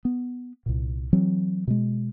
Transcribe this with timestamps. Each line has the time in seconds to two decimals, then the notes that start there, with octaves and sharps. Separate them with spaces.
0.05 B3
0.66 C2 A#2
1.13 E3 F#3 C4
1.67 B2 G#3